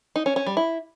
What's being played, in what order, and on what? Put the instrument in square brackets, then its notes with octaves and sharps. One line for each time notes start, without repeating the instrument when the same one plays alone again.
[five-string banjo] D#4
C#4
C#4
G3
E4